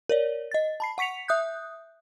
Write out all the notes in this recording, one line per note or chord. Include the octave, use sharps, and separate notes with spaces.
A#4 C#5 D5
D#5 A6
A5 B5 C7
F#5 C#6 B6 C#7 F7
E5 D#6 F#6 G6